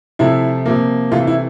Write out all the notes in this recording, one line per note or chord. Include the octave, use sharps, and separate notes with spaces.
C3 F3 A3 E4
C3 F3 A#3
C3 E3 A3 F4
E4